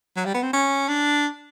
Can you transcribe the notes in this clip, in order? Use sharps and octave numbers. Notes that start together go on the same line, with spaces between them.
F#3
G3
B3
C4
C#4
D4